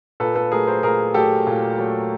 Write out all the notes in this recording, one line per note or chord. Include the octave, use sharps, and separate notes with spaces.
A#2 A4 B4
A4 B4
F#3 A3 G#4 A#4
A#4 C5
A#2 G#4 A#4
F#3 A3 G4 A4
A#2
F#3 A3